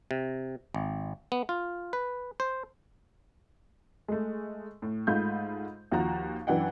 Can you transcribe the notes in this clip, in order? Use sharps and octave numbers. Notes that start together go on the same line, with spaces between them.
C3
G#1
B3
F4
B4
C5
G#3 A3
A2
G#2 A3 F4 B5 G6
D#2 F3 F#4 A#5
F#2 E3 D4 F#5 G5